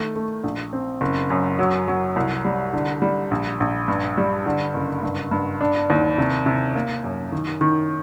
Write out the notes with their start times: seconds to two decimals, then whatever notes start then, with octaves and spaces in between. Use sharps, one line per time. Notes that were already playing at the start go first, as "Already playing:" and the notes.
Already playing: D#3 A3
0.16 A3
0.43 A#1
0.73 C4
1.01 F#1
1.30 F#2
1.59 F#3
1.88 F#3
2.16 C2
2.45 G3
2.73 D3
3.02 G3
3.31 A#1
3.60 A#1
3.88 G2
4.17 G3
4.46 D3
4.74 F#1
5.03 G2
5.31 G2
5.61 D4
5.90 D#2
6.18 C3
6.46 C3
6.75 A#3
7.04 F#2
7.32 D#3
7.61 D#3